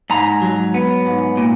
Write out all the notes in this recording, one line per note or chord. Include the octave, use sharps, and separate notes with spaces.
G#2 A#5
F#3
B3
G#2
A#2